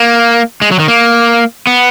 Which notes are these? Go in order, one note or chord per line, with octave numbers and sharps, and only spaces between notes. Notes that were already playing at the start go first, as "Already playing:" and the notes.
Already playing: A#3
G#3
F#3
D#3
A#3
B3